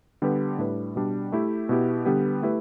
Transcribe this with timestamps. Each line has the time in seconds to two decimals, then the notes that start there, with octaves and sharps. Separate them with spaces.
0.22 D3 G3 B3 G4 B4
0.59 A2 G3 D4 B4
0.96 B2 G3 D4
1.32 A3 E4 G4
1.69 B2 B3 E4 G4
2.05 D3 G3 B3 G4 B4
2.43 A3 E4 G4 B4